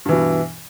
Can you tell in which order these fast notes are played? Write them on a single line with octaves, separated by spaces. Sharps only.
G2 E3 B2